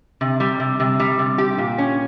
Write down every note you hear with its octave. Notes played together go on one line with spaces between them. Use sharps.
C3
G3
C3
C3
G3
C3
G4
A#2
C#4